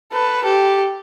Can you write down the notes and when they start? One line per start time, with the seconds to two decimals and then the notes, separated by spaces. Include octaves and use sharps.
0.12 A4 B4
0.44 G4 A4